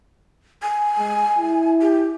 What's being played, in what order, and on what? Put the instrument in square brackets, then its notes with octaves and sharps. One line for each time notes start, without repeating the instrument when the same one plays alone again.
[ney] G#5
[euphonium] G#3
E4
[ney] G4